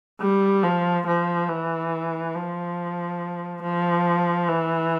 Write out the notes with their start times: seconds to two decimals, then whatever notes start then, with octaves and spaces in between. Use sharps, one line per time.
0.21 G3
0.64 F3
1.07 F3
1.49 E3
2.35 F3
3.63 F3
4.49 E3